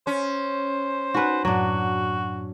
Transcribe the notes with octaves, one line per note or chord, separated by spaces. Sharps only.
C#4 C5
D#4 F#4 B4 G#5 F#6
F#2 A2 F#3 D4 F#4